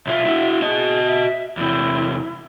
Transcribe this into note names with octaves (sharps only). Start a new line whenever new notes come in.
B1 F4 E5
E4 F#4
F#4 G#4 D#5
E5
E2 C3 E4